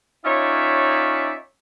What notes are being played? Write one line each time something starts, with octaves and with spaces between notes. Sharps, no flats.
C#4 D#4 F4 C#5 D5 E5